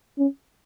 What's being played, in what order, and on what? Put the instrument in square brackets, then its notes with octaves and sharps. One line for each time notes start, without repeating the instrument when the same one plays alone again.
[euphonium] C#4